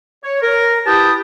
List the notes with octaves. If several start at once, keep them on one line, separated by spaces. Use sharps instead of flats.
C#5
A#4
E4 G4 B4 G5 A5 D#6